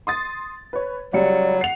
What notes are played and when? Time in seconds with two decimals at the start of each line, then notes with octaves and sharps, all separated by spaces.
0.07 C6 D#6 A6
0.73 B4 C#5
1.13 C#2 F#3 G3 D5 C#7
1.61 F#5 C7 F7